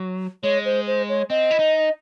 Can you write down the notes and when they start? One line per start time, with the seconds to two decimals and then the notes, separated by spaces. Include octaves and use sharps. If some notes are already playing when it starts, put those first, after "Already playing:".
Already playing: F#3
0.43 G#3 C#5
0.65 C5
0.87 C5
1.09 C#5
1.30 C4 D#5
1.51 E4
1.59 D#4